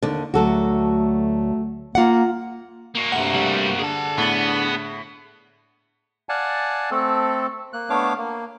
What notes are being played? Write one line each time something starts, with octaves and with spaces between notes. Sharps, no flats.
D#2 D3
D2 F#3 A3 F#4 A4
A#3 F4 F#5
A#3 F#4
G2 C3 A3 F#5
G3
D3 D4 G#4 A5
A2 B3 A6
D5 F5 F#5 G#5 A5
A3 C4 A4
A#3 F#6
A3 B3 D4 C#5 F5 D6
A#3